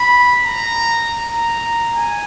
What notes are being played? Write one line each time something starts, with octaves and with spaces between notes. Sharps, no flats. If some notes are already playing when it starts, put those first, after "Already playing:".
Already playing: B5
A#5
A#5
G#5